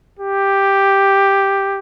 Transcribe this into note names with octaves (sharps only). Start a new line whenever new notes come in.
G4